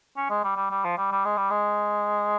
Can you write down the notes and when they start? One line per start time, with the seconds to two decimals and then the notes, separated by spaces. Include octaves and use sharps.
0.17 C#4
0.30 G#3
0.44 G3
0.56 G3
0.71 G3
0.84 F3
0.97 G3
1.11 G3
1.25 G#3
1.37 G3
1.50 G#3